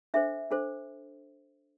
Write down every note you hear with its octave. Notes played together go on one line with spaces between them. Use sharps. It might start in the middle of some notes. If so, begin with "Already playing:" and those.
D4 A4 C5 E5
D4 A4 C5